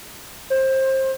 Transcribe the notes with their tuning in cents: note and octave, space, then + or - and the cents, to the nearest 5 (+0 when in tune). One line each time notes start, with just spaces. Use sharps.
C5 +25